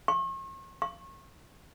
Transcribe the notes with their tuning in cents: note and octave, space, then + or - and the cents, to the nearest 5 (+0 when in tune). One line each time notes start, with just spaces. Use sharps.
C#6 -45
C#6 -35